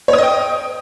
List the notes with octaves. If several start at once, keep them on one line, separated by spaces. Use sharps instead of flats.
C#5
D#6
D#5
G5